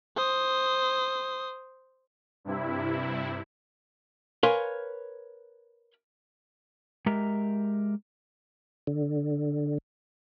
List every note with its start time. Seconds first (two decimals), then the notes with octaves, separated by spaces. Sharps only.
0.16 C5 D#6
2.45 G2 C3 E4
4.43 A#4 B4 C#5 F5 G#5 C6
7.06 G#3 G4 A#4 E5 A#5
8.87 D3